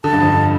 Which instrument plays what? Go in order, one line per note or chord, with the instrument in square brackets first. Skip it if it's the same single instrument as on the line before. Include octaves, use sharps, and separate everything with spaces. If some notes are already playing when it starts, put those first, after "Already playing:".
[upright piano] D3 [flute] A5
[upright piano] G2
F2
G2